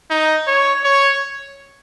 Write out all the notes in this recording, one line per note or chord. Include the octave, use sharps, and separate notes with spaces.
D#4
C#5
C#5